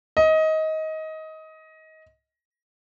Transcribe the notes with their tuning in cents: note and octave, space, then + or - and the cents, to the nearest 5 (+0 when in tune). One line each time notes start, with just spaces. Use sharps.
D#5 +20